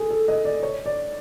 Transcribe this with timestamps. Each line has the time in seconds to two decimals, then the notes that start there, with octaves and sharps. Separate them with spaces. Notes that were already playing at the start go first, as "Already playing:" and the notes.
Already playing: G#4 A4
0.10 A4
0.28 D#5
0.45 D5
0.63 C#5
0.86 D5